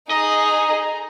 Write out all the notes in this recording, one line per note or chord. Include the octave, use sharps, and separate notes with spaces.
D#4 G#4 D#5 A#5